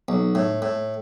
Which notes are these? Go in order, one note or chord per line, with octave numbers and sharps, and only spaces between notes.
B1
A2
A2